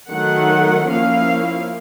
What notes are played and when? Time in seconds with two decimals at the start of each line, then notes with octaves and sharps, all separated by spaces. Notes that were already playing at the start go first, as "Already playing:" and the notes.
0.11 D#3 F#3 A3 F#5
0.89 F3 A#3 C#4 E4 F5